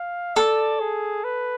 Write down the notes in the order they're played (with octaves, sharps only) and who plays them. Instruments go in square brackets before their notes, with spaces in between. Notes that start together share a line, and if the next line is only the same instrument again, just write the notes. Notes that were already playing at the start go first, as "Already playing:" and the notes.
Already playing: [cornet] F5
[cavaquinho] A4 [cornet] D5
[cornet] G#4
B4